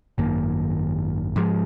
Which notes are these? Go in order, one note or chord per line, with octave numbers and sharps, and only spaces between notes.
G#1 F#2 D#3 A#3
G#2 F3 G#3